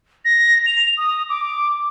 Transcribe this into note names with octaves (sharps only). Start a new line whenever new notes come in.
A#6
F7
D#6
D6